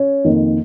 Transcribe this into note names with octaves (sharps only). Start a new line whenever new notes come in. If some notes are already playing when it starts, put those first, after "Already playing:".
Already playing: C#4
F2 D#3 A#3